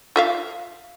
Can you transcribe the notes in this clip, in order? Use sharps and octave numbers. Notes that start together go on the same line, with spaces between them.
F4 E5 F5